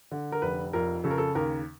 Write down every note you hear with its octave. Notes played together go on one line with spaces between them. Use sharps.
D3
A#4
F1 B4
F2 A#4
C#3 A4
A#4
A4
D#2 A#4